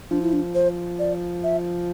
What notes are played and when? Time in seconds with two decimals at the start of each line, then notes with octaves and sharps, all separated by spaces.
0.11 F3 D4
0.22 E4
0.33 D4
0.55 C5
0.99 D5
1.44 E5